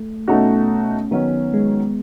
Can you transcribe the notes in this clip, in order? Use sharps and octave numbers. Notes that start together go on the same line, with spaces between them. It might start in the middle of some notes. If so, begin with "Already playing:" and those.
Already playing: A3
B2 A3 C#4 D#4 F#4
D#3 F#3 B3 C#4
G#3